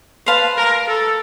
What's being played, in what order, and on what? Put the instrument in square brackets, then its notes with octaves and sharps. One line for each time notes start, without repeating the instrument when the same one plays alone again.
[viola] B4 [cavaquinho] C5 F5 A5
[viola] A#4
A4